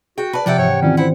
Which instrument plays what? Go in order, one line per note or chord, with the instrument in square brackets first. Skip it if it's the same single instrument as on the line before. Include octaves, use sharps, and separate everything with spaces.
[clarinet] F#4 [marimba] G#4 [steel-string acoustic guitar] G5
[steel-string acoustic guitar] B4 D5 [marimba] A5 B5
[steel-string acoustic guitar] C3 F#5 G5 [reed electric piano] F3 E5 [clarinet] D5
[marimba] G#2 E3 [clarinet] C#5
[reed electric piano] D#3 E3 [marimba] C4 F4 D5 [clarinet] C#4
[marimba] C#4 C5 [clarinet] E4 [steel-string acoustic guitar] F#5